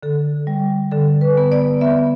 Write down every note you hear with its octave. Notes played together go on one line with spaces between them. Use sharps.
D3 A4
G3
D3 A4
B4
B3
D5
B3 E5